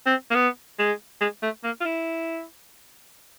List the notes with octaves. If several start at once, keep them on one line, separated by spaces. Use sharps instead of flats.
C4
A#3
B3
G#3
G#3
A3
A#3
F4
E4